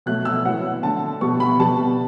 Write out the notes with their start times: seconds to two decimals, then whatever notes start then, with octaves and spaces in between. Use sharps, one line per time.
0.06 B2 F#3 A3 F#6
0.25 E6
0.45 A2 F#3 B3 F#5
0.83 D3 A3 A5
1.21 B2 G3 B3 C#6
1.40 B5
1.60 B2 G3 B3 A5